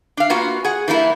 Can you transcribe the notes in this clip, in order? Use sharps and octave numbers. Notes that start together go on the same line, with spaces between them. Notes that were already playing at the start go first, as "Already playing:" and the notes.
D4 F5
A#3 B3 F4 F#4
G#4 F#5
E3 G3 A#3 E4